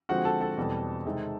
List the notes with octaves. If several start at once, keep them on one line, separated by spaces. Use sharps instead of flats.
D3 F3 G#3 C4 F#4 F#5
A4 A5
A4 A5
E2 B2 G3 C4
C3 D#3 G#3 C4 D#4